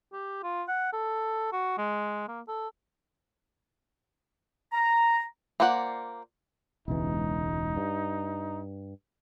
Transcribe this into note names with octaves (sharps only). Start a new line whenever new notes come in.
G4
F4
F#5
A4
F#4
G#3
A#3
A4
A#5
A#3 F4 C5 D5 F#5
E1 C#2 E3 D#4
G2